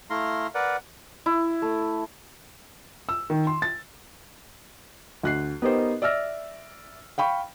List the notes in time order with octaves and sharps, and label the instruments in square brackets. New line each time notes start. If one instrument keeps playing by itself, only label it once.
[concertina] A3 E4 F5 A#5 C6
A#4 B4 D5 F#5
[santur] E4
A3
[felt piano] E6
D#3
C6
A6
D2 F#6 C7
B3 D#4 G4 A#4 C5
D5 E5 E6 F6 A#6
F5 G5 B5 C#6